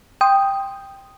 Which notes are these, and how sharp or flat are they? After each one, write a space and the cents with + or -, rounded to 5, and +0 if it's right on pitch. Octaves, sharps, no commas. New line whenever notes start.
G5 +5 C6 +0 D#6 +0